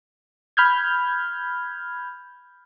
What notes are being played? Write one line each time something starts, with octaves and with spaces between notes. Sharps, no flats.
B5 F6 G6 G#6